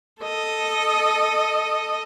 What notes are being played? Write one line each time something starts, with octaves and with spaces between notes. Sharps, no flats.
A4 D#5